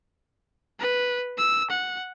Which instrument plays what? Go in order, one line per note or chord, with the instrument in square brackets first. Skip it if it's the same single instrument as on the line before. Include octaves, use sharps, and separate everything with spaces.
[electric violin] B4
E6
F#5